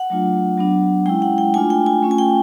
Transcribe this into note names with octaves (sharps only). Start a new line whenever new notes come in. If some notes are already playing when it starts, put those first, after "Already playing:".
Already playing: F#5
F#3 A3 D4 F4
F#3 B3 D4
G#3 C#4 E4 G5
F#5
G5
A3 D4 F4 G#5
G5
G#5
A3 C#4 F4
G#5
G5